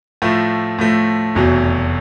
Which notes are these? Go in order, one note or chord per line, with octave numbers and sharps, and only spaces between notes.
A2 F3 A3
A2 F3 A3
F1 E2 B2 F#3